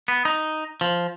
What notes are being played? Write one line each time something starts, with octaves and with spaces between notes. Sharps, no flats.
B3
D#4
F3